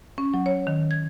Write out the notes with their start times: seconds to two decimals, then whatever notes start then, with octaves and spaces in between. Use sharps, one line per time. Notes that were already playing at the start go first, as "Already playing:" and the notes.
0.18 C#4
0.34 F#3
0.46 C#5
0.67 D#3
0.91 G#6